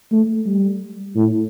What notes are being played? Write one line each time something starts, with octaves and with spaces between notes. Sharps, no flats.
A3
G3
A2